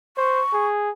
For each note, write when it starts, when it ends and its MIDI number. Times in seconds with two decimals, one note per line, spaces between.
0.17 0.42 72
0.17 0.66 85
0.53 0.90 68